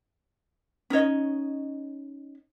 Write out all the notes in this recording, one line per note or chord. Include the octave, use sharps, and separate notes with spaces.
C#4 D#4 C#5 D#5